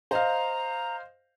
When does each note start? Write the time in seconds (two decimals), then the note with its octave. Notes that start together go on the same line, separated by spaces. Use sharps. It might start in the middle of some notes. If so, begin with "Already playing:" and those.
0.11 C5 D#5 F5 A#5